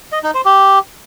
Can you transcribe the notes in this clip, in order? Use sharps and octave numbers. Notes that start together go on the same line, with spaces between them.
D#5
D#4
C5
G4